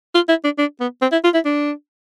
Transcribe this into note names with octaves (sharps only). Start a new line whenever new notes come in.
F4
E4
D4
D4
B3
C4
E4
F4
E4
D4